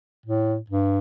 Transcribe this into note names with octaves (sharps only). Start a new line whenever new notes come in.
A2
G2